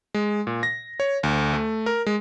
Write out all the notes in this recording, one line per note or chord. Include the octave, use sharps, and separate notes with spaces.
G#3
A#2
A#6
C#5
D2
A3
A#4
G#3